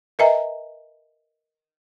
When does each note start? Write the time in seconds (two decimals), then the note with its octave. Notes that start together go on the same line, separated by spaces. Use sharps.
0.19 A#4 B4 D#5 E5 G#5 A#5